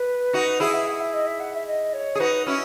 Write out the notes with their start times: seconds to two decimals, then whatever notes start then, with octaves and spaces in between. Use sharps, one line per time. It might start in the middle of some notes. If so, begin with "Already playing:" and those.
Already playing: B4
0.33 D#4 F#4
0.60 E4 G#4 F#5
0.74 E5
0.87 F#5
1.00 E5
1.13 D#5
1.26 E5
1.40 F#5
1.54 E5
1.67 D#5
1.93 C#5
2.15 G#4
2.20 D#4 F#4 B4
2.47 C#4 E4 F#4